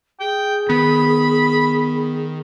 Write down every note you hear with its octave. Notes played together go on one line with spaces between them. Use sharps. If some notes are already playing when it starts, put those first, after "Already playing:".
G#4 G5
D#3 B3 B5